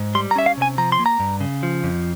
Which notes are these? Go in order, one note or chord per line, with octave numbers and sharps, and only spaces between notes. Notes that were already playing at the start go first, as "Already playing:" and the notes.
Already playing: G#2
G3 C6
A#5
C#4 E5
F5
C3 G#5
F3 A#5
C6
A#3
A#5
G2
C#3
F3
F2